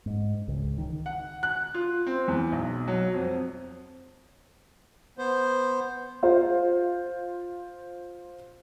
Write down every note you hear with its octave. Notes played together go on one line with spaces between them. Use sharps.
G#2
C#2
D#3
F#5
F#6
F4
C4
E2
B1
F#3
F2
B3 C5
F4 C5